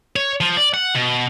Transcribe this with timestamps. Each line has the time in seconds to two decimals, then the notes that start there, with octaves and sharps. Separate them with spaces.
0.16 C#5
0.41 F3
0.57 D5
0.74 F#5
0.95 B2